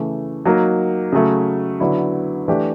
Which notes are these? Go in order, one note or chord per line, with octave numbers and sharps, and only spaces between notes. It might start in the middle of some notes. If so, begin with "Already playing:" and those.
Already playing: C#3 E3 A3
F#3 A#3 D#4
C#3 F#3 A3
D3 F#3 B3 E4
E3 A3 D4 G4